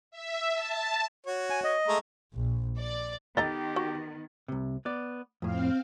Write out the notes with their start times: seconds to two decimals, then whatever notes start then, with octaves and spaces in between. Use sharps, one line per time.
0.11 E5
0.54 A5
1.26 F#4 C#5
1.50 G#5
1.64 D#5
1.88 G#3 A3 A#5
2.34 A#1
2.78 D5
3.37 D#3 B3 G4 A4 D#5 A#5 A6
3.76 F#4
4.48 C2 C3
4.85 B3 D5
5.42 F2 A2 C4 F5